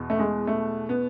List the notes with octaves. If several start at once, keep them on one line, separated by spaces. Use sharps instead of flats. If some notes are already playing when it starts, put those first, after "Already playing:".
Already playing: E2 B2
A3
G#3
A3
B3